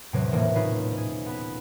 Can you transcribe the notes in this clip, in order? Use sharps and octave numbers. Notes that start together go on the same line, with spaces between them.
E2 A2 C3 F#3 C4
D#1 A2 E3 A#3
C4 C#4 D#4 F4 B4
G#4
B3 B5